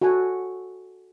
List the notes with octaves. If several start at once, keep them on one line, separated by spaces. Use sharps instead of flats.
F#4 A4 F#5 G#5